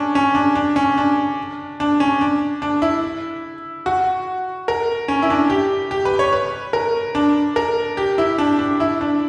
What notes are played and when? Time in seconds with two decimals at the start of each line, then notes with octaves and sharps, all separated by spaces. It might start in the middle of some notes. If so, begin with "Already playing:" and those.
Already playing: C#4 D4
0.15 C#4
0.35 D4
0.55 D4
0.76 C#4
0.98 D4
1.80 D4
2.00 C#4
2.21 D4
2.62 D4
2.82 E4
3.86 F#4
4.68 A#4
5.08 C#4
5.22 E4
5.30 D4
5.50 G4
5.91 G4
6.05 B4
6.19 C#5
6.33 B4
6.73 A#4
7.15 D4
7.56 A#4
7.97 G4
8.18 E4
8.38 D4
8.59 D4
8.80 E4
9.01 D4